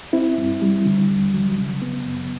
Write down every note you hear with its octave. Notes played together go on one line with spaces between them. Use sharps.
C4 E4
G2
G3
D3
D#2
F#3
C#3
B3
F#2